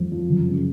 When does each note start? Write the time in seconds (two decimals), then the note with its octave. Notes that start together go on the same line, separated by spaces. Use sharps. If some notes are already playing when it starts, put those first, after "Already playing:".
Already playing: F2
0.12 F3
0.30 F#1
0.48 C#3